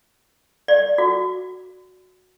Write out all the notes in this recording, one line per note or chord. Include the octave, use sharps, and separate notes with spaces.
D5
F#4